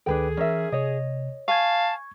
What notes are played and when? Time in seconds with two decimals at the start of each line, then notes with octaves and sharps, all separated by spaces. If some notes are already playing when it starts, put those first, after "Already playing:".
0.06 D2 D#3 D4 G#4 A4 B4 G5
0.37 E3 C#4 A#4 E5
0.72 C3 C#5 D#5
1.48 F5 G#5 A5 C#6 G#6